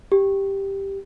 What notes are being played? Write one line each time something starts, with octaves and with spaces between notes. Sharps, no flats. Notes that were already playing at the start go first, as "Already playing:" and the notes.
G4